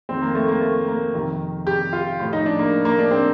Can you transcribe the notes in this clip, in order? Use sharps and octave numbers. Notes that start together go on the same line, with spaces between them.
F2 D#3 C4
A#3
A3
A#3
A3
A#3
F2 C3 D#3
G4
F4
A2 F3
D#4
D4
A#3
A#3
D4
C4